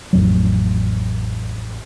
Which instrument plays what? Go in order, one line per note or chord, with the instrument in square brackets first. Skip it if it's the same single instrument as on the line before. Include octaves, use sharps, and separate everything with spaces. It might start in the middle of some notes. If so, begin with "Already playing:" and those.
[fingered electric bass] A1 F2 F#3